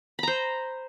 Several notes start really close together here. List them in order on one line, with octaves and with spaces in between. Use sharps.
B5 A#5 C5